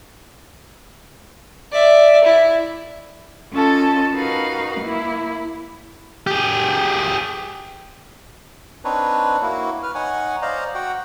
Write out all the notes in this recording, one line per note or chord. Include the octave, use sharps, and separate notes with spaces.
D5 E5
E4
C#4 F4 A4 D#5 A5
D#4 F#4 A#4 B4 F5
A#3 E4
G4 G#4
C4 D4 D#4 B4 C#5
A#3 E4 F#4
B4 F6
D#4 C#5 F#5 G#5
C5 D5 D#5 F5 A#5
F#4 F#5 G5